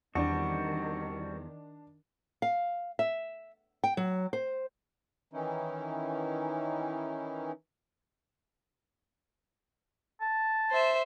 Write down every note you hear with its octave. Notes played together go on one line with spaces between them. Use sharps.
E2 D#3 G3 C4 D4 F#4
F5
E5
G5
F#3
C5
D#3 E3 C#4 D#4 E4
A5
C5 E5